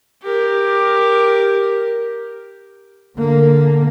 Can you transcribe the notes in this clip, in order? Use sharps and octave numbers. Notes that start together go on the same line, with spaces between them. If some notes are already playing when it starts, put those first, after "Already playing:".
G4 A#4
D3 A#3